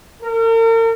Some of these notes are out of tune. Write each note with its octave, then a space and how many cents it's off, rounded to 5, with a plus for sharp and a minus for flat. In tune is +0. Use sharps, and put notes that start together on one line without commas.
A#4 -40